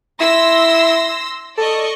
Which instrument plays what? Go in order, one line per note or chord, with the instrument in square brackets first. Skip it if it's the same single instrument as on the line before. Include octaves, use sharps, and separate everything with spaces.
[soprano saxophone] E4 [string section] C6 E6 A#6
[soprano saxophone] A4 [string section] D5 D#5 C#6